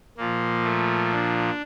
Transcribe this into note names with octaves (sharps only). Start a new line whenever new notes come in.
A#2 F3 A#3
A3
D4